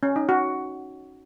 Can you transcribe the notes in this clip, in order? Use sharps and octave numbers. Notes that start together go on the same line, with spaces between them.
C#4
D#4
F#4